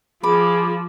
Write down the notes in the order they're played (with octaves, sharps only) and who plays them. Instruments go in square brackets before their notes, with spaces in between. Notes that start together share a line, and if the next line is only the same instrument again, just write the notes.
[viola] F3 [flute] G#4 [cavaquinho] B5 [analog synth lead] D6